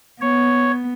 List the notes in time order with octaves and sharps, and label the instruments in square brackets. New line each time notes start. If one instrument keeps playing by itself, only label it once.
[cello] B3 [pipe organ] C#5